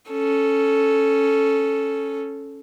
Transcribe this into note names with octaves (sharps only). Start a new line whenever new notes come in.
C#4 A4